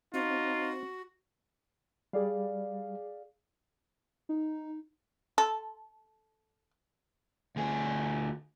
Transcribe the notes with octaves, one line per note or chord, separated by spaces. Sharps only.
C4 D#4 F4 F#4
G3 G#4 D5 F5
D#4
A4
D2 G#4